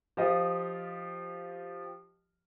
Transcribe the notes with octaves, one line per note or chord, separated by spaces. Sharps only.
F3 F4 G4 D#5